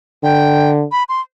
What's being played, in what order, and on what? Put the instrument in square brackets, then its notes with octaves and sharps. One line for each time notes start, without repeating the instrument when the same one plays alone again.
[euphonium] D3 [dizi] G5
[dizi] B5
C6